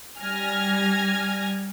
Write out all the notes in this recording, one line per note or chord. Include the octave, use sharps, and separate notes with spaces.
G3 G#5 F6 G#6 A#6